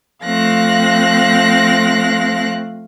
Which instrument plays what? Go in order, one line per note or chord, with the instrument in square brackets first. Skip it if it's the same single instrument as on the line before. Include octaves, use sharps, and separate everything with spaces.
[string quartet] F3 A3 C4 F5 F#6 A#6